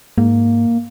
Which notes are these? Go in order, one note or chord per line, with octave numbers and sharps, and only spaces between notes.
G#2 A#3